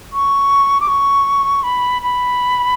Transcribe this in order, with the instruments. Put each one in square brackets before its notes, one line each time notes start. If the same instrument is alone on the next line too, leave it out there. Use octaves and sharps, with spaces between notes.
[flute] C#6
D6
C#6
B5
B5